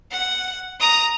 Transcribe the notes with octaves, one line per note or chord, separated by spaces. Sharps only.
F#5
A#5 D#6